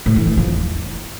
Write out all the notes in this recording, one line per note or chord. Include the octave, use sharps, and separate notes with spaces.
A2
E3
F2
F3
E2